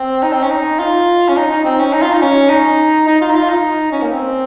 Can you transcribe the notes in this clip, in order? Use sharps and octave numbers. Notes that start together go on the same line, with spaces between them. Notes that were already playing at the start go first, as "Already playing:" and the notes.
Already playing: C4
D#4
C4
C#4
D#4
F4
C#4
D#4
D#4
C4
C#4
D#4
F4
D#4
C#4
D#4
D#4
F4
D#4
F4
D#4
C#4
A#3
C4